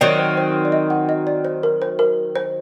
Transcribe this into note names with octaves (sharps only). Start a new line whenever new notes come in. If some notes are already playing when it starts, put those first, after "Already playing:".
D#3 F#3 C4 D5
C5
C5
D5
D#5
F#5
D#5
D5
C5
A#4
C5
A#4
C5